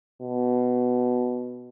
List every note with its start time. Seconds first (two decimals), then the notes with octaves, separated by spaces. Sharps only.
0.22 B2